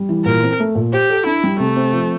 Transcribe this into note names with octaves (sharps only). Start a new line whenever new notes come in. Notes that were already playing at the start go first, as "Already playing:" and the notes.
Already playing: G3
E3
A#2 A#4
C4
A3
A#2
G4 C5
A4
D4 E4
G3
C3 A3
C4
F3